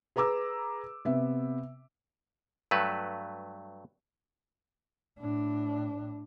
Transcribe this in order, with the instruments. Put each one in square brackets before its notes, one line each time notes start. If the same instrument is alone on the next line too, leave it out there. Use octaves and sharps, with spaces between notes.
[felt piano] G#4 B4 A#5 D6 E6
C3 B3 E5
[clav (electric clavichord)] G2 F#3 A3 B4
[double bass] A2 D4